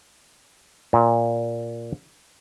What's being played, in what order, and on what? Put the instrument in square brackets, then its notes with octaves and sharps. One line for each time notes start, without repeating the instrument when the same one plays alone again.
[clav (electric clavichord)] A#2